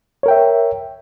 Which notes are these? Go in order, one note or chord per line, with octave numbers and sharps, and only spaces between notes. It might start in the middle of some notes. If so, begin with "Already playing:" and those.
A#4 C#5 E5 G5